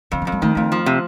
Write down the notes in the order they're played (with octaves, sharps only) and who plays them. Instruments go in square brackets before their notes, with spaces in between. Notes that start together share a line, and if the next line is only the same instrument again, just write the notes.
[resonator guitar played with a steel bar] F2 [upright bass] D3
[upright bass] F3
[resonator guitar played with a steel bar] F2
[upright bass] G3
[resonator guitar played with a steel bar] D#3 [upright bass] A3
[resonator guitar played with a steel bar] F2 [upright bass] A3
[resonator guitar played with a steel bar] F3
C3